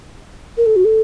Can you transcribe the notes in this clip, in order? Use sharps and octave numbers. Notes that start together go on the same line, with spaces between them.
A#4
A4
F#4
A4